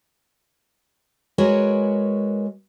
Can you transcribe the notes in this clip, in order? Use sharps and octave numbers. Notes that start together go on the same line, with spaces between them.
G#3 F#4 A#4 B4 C#5 G#5